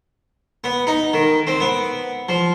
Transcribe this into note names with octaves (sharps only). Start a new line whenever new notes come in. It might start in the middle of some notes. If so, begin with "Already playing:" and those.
B3
D#4
D#3
C4
B3
F3